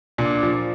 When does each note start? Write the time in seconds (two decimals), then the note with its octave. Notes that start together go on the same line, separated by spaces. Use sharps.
0.18 A#2 D4
0.43 F3